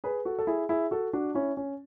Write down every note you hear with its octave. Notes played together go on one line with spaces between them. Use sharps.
G#4 B4
F#4 A4
A4
E4 G#4
E4 G#4
F#4 A4
D4 F#4
C#4 E4
C#4